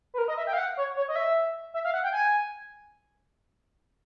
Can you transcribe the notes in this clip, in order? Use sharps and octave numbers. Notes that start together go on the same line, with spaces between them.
B4
A#4
D#5
E5
G5
F5
F#5
C#5
C#5
D#5
E5
E5
F5
F#5
G5
G#5